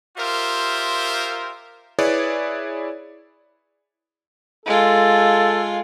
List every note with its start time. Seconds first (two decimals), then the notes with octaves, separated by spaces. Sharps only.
0.18 F4 G4 A#4 C5 E5
1.99 E4 G#4 B4 C#5 D5
4.66 G#3 F4 A4